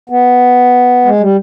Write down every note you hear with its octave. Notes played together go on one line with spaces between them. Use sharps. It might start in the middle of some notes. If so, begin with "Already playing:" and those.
B3
G#3
G3